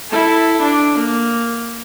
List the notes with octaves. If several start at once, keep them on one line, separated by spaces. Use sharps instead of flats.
E4 A4
D4
A#3